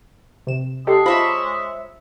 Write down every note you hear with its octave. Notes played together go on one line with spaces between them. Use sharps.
C3 E7
G#3 G4 A4 D#5 A5 C7
F4 C5 C#5 E5 B5 A#6